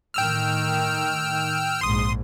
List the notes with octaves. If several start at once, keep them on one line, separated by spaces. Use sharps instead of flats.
A2 D#3 G5 E6 F6
A#1 G#2 C6 D#6